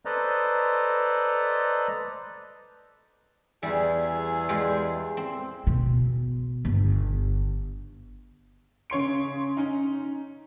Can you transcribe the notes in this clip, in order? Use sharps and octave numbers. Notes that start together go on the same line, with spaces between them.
A4 B4 C5 D5 D#5 A#5
E2 G3 E4 G#4
G3 G#3 F4
C4
B2
G1
C#3 C#5 C6 D7
C#4 D#4